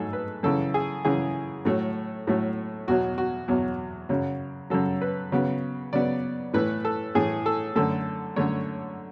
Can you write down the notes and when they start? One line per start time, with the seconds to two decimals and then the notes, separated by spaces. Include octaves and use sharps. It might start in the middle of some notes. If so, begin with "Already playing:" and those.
Already playing: G#2 F#3 A3 G#4 A4
0.13 B4
0.43 F#2 C#3 E3 A4
0.74 G#4
1.05 F#2 C#3 E3 G#4
1.65 A2 F#3 A3
2.27 A2 F#3 A3
2.88 E2 B2 F#3 F#4
3.18 F#4
3.48 E2 B2 F#3
4.09 F#2 C#3 F#3
4.70 F#2 C#3 F#3 A4
5.02 B4
5.32 C#3 F#3 B3
5.93 C#3 F#3 B3 D5
6.53 A2 E3 A3 B4
6.85 A4
7.15 A2 E3 A3 G#4
7.46 A4
7.75 F#2 D3 A3 A4
8.36 F#2 D3 A3 C#5